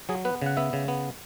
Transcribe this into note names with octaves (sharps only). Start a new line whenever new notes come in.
F#3 G#4
B3 B4
C#3 F#5
B3 E5
C#3
B3